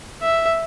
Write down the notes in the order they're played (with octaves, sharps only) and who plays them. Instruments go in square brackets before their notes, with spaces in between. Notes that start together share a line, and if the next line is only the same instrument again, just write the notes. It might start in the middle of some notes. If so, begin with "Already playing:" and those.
[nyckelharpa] E5